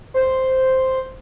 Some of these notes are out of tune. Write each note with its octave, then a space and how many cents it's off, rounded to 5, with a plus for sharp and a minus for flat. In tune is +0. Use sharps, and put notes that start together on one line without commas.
C5 +0